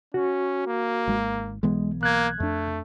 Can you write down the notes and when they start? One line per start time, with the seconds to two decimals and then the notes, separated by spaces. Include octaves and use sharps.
0.14 C#4 F#4
0.67 A#3
1.07 G#1 G#3
1.63 B1 E3 G#3 B3
2.03 A#3 F#6 G#6
2.40 F2 A3 D4